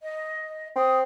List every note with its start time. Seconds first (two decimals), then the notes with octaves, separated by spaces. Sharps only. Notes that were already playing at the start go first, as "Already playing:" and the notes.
0.01 D#5
0.76 C4 D#6